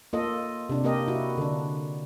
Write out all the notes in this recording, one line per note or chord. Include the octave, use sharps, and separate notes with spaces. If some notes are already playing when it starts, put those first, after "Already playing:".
A#3 F4 A4 D#5
C3 D4
A#3 G4 A#4 D#5
E4 F#4
D3 D4